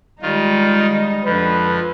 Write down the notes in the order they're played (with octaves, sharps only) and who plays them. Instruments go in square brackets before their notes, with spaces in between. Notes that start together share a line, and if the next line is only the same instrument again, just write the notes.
[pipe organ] D#3 F4 [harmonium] G3 [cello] G#3 D#4
[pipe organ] F2 F3 [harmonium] D3 [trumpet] B4